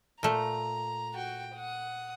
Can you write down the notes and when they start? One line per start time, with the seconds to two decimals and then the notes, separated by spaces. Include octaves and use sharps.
0.23 A#2 A3 A#5
1.14 F#4 G5
1.55 F#5 D#6